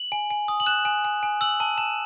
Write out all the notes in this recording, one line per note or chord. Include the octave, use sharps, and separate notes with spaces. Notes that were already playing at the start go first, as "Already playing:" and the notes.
Already playing: F#7
G#5
G#5
D#6
F#7
F#6 E7
G#5
G#5
G#5
E6 F#7
A5
A5 E7